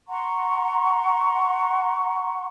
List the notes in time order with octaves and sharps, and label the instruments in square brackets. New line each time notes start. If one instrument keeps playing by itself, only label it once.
[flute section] F#5 A#5 C6 C#6